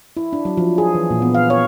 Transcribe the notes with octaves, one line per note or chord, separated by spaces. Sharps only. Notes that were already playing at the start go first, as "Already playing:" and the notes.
E4
D4
F#3
F3
G#4
E3
A#2
B3
F5
C#5